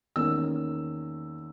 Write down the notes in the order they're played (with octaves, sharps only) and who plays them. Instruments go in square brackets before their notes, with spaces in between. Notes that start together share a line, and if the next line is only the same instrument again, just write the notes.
[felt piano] E2 D#3 A#3 C#4 E6